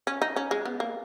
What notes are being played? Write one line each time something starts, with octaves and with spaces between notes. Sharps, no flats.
C#4
D#4
C#4
G#3
B3
A#3